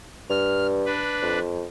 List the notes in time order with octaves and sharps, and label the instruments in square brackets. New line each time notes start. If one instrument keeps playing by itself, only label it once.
[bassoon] G2 [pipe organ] F6
[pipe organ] D4 B4
[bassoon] F2